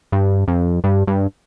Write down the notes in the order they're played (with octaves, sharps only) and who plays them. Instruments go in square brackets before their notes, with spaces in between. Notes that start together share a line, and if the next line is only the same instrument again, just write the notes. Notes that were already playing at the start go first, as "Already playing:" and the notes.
[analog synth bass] G2
F2
G2
G2